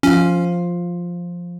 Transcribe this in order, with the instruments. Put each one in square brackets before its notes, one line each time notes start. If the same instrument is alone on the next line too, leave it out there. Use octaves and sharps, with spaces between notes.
[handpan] F3 F4 F5 [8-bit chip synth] C#4